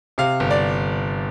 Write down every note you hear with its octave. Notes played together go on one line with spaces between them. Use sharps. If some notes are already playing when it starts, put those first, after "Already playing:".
C3 F5
G1
D5